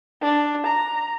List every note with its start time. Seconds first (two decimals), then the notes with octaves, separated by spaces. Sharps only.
0.22 D4
0.67 A#5